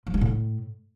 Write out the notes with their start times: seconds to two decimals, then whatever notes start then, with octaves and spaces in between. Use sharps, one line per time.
0.07 F3
0.14 G3
0.21 A2